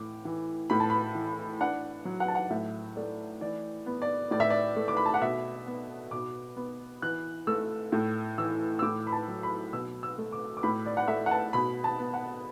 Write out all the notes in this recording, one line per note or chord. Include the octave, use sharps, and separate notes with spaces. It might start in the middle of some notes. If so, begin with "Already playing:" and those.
Already playing: A2 E3 D6
E3
A2 B5
A5
B5
E3
D4 F#5
F#3
F#5
A5
F#5
A2 E5
A3 D5
E3 D5
B3
D5
A2 D5
E5
D5
A3
D6
B5
A5
F#5
B2 E5
B3
B2 D6
B3
E3 F#6
A3 E6
A2
E3 E6
E6
A2 D6
B5
A5
F#3
B5
B2 E6
E6
A3
D6
D6
A2 B5
D5
F#5
A3 E5
F#5
A5
B2 B5
A5
B3
F#5